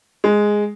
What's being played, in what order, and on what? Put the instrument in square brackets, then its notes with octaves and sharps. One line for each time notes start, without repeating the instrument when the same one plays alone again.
[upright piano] G#3